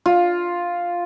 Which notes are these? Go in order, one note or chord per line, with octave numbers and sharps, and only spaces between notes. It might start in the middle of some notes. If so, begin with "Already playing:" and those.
F4